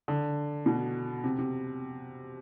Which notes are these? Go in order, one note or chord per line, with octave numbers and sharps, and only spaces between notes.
D3
B2
C3
C3